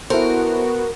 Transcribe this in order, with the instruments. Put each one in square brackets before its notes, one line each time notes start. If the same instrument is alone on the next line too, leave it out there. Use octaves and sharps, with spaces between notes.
[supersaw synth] B3 F#4 [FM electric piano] E4 A4 C5 [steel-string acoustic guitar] A#4